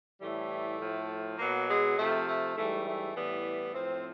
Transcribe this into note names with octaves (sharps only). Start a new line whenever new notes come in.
A2 E3 G3 A3
A2 F3
B2 F#3 A#3
G#3
C3 F3 A3
A3
G#2 E3 G3 A3
A3
A2 E3 G3 B3
A2 F3 C4